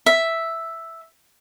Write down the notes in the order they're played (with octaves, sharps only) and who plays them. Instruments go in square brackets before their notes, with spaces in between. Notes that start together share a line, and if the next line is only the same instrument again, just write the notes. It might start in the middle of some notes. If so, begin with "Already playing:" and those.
[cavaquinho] E5